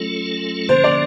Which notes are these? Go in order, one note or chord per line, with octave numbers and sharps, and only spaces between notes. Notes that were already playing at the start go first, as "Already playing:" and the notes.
Already playing: F#3 A3 C#4 F4 A4
D3 F3 A#3 C#4 C5
D5